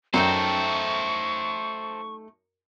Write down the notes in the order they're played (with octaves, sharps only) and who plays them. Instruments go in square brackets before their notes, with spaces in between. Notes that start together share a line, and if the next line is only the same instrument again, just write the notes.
[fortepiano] F#2 [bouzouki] A3 D#4 G5 [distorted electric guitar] A4 C5 [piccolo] C#6